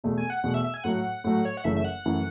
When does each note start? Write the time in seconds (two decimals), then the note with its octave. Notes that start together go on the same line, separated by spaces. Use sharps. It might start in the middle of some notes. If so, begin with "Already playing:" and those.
0.04 E2 B2 A3
0.17 G#5
0.30 F#5
0.44 E2 B2 A3 F#5
0.54 E5
0.64 E5
0.74 G#5
0.84 A2 F#3 A3 F#5
1.24 A2 F#3 A3 F#5
1.45 C#5
1.57 F#5
1.64 F#1 F#2 E3 A3 E5
1.76 E5
1.85 F#5
2.06 F#2 E3 A3